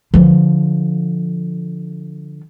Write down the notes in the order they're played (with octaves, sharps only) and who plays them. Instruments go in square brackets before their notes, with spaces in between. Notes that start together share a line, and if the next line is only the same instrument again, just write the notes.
[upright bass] D3 F3